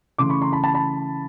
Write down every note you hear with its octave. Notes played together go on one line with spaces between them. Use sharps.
C#3 E3 A3 C6 D6
B5 C#6
A#5 C6
A5 B5
A5 B5
A5 B5